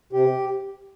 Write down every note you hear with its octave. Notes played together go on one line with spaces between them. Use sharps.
C3 G4